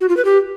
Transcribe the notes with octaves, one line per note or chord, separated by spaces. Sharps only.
F#4
F4
B4
G4